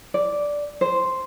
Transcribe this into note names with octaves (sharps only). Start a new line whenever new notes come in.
D5
C5